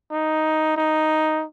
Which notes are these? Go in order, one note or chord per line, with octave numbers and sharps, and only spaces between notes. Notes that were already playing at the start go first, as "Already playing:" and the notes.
D#4
D#4